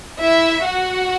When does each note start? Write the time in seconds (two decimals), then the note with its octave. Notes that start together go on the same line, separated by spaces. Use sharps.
0.20 E4 E5
0.65 F#4 F#5